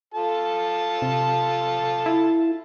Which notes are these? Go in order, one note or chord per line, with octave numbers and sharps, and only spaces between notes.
F4 A4 A5
C3
E4